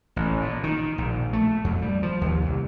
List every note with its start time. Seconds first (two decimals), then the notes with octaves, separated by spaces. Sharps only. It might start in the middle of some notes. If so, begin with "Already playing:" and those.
0.16 A1
0.41 A#2
0.63 D#3
0.98 A#1
1.33 A3
1.64 F2
1.82 G3
2.03 F3
2.21 D#2
2.46 C2